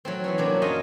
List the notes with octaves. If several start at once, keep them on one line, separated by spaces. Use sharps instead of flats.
F#3 A3 C4
E3 B3 C#4
C3 F#3 A#3 D4
F#2 F4 C#5 D#5 G#5